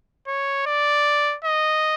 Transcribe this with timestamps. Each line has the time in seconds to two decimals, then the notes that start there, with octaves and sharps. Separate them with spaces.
0.28 C#5
0.66 D5
1.45 D#5